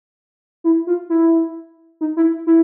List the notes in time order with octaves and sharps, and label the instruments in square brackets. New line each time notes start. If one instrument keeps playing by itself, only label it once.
[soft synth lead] E4
F4
E4
D#4
E4
E4